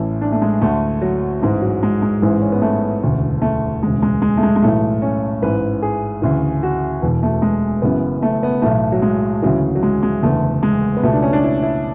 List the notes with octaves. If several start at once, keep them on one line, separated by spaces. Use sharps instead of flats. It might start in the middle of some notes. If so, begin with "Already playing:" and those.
Already playing: A1 A2 E3
D4
A3
G#3
D2 D3 A3
F#3
A1 G#2 E3 G#3
F#3
G#3
G#3
A1 G#2 E3
C#4
B3
A3
E1 D2 C#3
A3
E1 D2 C#3 G#3
G#3
G#3
A3
G#3
G#3
B1 A2 E3 A3
C#4
A1 G#2 E3 B4
G#4
D2 C#3 E3
F#4
E1 E2 B2
A3
G#3
F#1 F#2 C#3 E3 B3
A3
B3
B1 A2 E3 A3
F#3
G#3
D2 C#3 E3 F#3
F#3
G#3
G#3
F#1 E2 D3 A3
G#3
B3
C#2 B2 A3
D4
C#4
D4
E4
E4